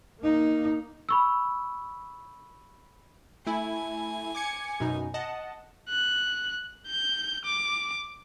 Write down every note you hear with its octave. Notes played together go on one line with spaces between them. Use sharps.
A#3 D#4
B5 C#6 E6
A3 E4 G#5
D6 G#6 C#7
F#2 B2 D#4
D#5 F#5 A5
F#6
G6
D6